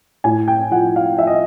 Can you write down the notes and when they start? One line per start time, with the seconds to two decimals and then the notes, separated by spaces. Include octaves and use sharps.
0.24 A2 G#5
0.48 G5
0.71 F3 F#5
0.96 F5
1.18 F3 E5
1.27 D#5